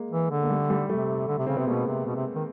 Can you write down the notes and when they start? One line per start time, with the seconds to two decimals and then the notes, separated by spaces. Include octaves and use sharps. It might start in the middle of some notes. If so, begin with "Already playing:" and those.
Already playing: G#3 A#3
0.11 E3
0.31 D3
0.43 A#3
0.50 G3 A3
0.70 G3 A3
0.90 C3 G3 A3
1.28 D3
1.38 C3
1.46 C#3 C4
1.57 C3 B3
1.67 B2 G#3 A#3
1.87 C3
2.06 B2
2.16 C3
2.35 D#3